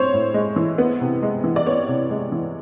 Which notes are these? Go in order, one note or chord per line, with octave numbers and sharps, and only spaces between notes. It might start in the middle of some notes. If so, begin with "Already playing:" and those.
Already playing: A2 C4 C5 C#5
A2
G#3
E3
B3
C3
G#3
E3
D5
B3 C#5
C3
G#3
E3